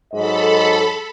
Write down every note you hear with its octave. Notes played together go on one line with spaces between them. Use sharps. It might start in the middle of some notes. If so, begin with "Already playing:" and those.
G#2 F#3 A4 D#5 B5